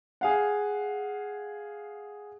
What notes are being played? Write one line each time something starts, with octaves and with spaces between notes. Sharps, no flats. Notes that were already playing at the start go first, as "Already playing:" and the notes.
G#4 F5 F#5